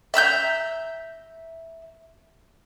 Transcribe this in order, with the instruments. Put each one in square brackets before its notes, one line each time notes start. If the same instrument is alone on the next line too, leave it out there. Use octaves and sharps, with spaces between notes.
[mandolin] E5 A#5 E6 G6